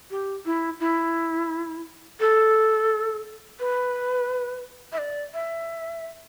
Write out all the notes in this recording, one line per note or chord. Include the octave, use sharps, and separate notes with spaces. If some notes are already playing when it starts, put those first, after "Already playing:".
G4
E4
E4
A4
B4
E5
D5
E5